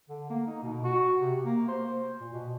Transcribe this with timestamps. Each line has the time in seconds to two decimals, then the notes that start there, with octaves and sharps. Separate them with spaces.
0.09 D3
0.30 A#3
0.47 D#4
0.63 B2
0.84 F#4
1.19 C3
1.44 A#3
1.68 C5
2.20 A#2
2.33 B2